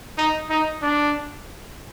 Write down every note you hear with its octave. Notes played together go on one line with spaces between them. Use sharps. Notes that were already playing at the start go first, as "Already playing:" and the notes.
D#4
D#4
D4